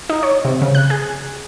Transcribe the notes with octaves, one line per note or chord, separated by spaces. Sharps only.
D#4
C#5
C3
C#3
F#6
G#4